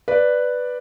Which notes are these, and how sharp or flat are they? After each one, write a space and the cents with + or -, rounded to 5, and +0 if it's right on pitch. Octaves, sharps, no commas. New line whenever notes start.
B4 +0 D5 +5